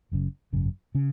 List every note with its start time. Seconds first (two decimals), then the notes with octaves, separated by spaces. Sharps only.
0.12 F#1 F#2 C#3
0.52 G#1 F#2 C#3
0.95 C#3 C#4